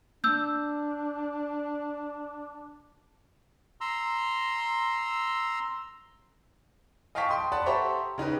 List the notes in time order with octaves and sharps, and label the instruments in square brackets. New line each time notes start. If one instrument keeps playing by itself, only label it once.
[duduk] D4 [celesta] E6 G6
[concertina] A#5 C6 E6
[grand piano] D#5 F5 G5 A5 C#6 B6
G5 C6 D#6
D5 F#5 A5 B5
G4 A4 C5 E5 A#5 C#6
C#3 D#4 G4 B4